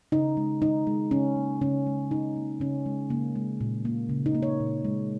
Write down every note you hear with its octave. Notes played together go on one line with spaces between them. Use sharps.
C#3 D#4
G#3
D#3 D#4
G#3
C#3 C#4
A#3
C#3 C#4
G#3
C#3 D#4
A#3
C#3 C#4
G#3
C#3 A#3
G#3
A#2
A#3
C#3
D#4
A#3
C#5
A#2
G#3